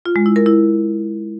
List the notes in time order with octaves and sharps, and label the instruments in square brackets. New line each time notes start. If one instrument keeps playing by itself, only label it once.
[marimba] F4
G#3
E4
A#4
E4